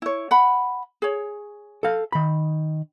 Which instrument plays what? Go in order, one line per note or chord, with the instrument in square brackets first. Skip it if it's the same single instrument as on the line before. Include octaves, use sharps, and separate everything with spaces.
[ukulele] E4 C#5
F#5 B5
G#4 C#5
[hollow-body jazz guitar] A4 F5
D#3 B5